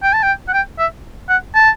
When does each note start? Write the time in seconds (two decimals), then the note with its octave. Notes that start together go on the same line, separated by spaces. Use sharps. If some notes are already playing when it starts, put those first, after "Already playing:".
0.03 G5
0.13 A5
0.23 G5
0.48 F#5
0.53 G5
0.79 E5
1.29 F#5
1.55 A5